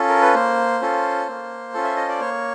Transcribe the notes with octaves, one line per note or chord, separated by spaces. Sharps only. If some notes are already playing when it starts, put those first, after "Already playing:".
Already playing: C#4 F4 A4
A#4
B4
A#3 C5
C#4 F4 A4
A#3
C#4 F4 A4
E5
D#5
D5
A#3 C#5